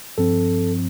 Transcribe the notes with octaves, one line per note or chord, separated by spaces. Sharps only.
G2 F3 C4 A4